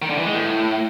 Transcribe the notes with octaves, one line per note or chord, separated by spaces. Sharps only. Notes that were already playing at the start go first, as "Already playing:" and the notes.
D#3
D3
E3
G#3
A2